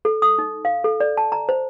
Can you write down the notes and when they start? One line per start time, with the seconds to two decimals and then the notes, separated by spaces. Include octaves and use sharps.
0.05 A4
0.22 D#6
0.39 D#4
0.65 F5
0.84 A4
1.00 D5
1.17 A5
1.32 A#5
1.49 C5